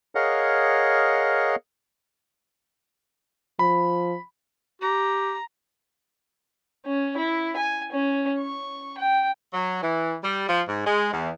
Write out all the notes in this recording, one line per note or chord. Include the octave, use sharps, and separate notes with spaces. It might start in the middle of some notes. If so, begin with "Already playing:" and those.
G#4 A#4 C#5 D#5 F5 F#5
F3 B5
G4 A#5
C#4
E4
G#5
C#4
C#6
G5
F#3
E3
G3
F3
G#2
G#3
E2